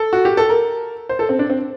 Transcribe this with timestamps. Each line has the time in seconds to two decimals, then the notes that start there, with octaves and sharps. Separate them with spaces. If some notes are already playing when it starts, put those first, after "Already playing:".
Already playing: A4
0.13 F#4
0.25 G4
0.37 A4
0.49 A#4
1.09 C5
1.19 A4
1.29 C4
1.39 D4
1.50 C4